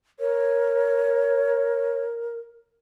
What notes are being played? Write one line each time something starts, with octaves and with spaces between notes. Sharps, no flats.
A#4 C#5